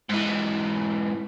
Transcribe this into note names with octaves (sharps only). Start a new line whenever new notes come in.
G#2 E3